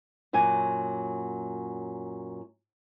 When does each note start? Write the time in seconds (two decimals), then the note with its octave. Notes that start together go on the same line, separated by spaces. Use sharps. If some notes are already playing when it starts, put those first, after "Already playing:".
0.33 F#2 A#2 F#3 G#5